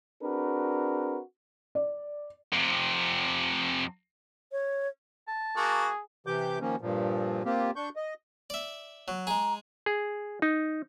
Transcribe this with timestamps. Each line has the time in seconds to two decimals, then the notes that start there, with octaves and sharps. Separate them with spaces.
0.22 C4 D4 F#4 G#4 A#4 B4
1.75 D5
2.53 F2 C3
4.52 C#5
5.28 A5
5.57 A#3 F#4 G#4
6.27 C3 E3 G4 D6 G6
6.61 D#3 F3 A#3 C#4
6.81 G2 A#2 F3
7.45 A#3 C4 F4 G4
7.76 D4 C#6 G6
7.96 D#5
8.50 D5 E5
9.08 F#3
9.27 G#3 G#4 A#5
9.86 G#4
10.42 D#4